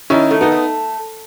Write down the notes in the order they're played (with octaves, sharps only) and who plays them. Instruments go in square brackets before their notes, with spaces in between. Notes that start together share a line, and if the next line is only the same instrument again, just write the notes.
[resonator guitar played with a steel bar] D#3 [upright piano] C#4 E4
[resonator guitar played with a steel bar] A3
[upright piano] B3 D#4
[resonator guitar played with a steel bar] A3